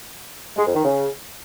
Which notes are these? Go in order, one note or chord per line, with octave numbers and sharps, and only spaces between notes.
G#3
F2
D#3
C#3